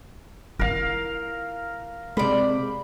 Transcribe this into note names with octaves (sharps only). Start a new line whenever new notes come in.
E4 F4 A#4 F5
C3 G#3 C5 D5 B5